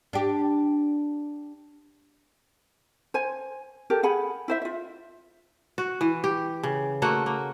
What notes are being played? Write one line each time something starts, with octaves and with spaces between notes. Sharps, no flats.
D4 G4
C5 G#5
G4 A4 A#4
G#4 F#5 G#5 B5
E4 C5 E5
F4 E5
F#4
E3
G4
C#3
A3 A#3 F#4 F#5
A#3